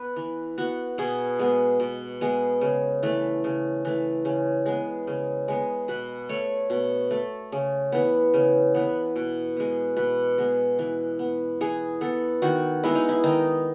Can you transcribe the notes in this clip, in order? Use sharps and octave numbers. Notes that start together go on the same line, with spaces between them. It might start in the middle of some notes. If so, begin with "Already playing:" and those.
Already playing: B3 B4
E3
B3 F#4
B2 G#4
G#3 B3
B2
G#3 B3
C#3
E3 A3
C#3
E3 A3
C#3
G#3 B3
C#3
G#3 B3
B2 B4
A3 C#5
B2
A3
C#3
E3 B3
C#3
E3 B3
B2
G#3 B3
B2 B4
G#3 B3
E3
B3
E3 G#4
B3 A4
D#3 F#4
G#3 B3 E4
D#4
E4
D#3 D#4